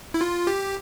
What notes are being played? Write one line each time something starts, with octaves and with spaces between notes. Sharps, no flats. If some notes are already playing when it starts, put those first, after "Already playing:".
E4
F4
G4